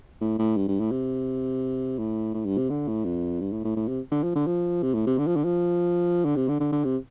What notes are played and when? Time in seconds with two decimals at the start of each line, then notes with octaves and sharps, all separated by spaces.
0.21 A2
0.39 A2
0.57 G2
0.68 G2
0.80 A2
0.91 C3
1.99 A2
2.34 A2
2.46 G2
2.58 C3
2.70 D3
2.88 A2
3.05 F2
3.41 G2
3.52 A2
3.64 A2
3.76 A2
3.88 C3
4.12 D3
4.23 F3
4.35 D3
4.47 F3
4.83 C3
4.95 A2
5.07 C3
5.18 D3
5.27 F3
5.36 D3
5.45 F3
6.25 D3
6.37 C3
6.49 D3
6.60 D3
6.72 D3
6.85 C3